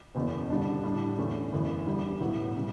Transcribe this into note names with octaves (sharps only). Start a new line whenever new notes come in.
F#1 E2 B2
G2 D3 G3 D4
A2 G3 D4
E2 D3 A3 C#4
G1 F#2 C#3 E3
E2 D3 G3
B1 A2 F#3 B3 E4
C#3 G3